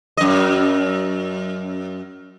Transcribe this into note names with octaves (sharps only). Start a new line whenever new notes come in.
F#2 D#5